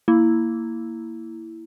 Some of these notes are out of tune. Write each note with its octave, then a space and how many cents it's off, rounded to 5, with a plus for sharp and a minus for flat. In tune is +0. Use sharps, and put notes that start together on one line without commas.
A#3 -10 E4 +0